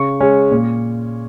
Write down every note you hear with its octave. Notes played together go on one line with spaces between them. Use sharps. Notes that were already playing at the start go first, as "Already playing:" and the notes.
Already playing: C#3 C#6
G#3 C#4
A#2